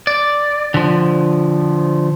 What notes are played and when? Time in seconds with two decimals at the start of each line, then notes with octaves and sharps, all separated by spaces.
0.07 D5
0.74 D3 F3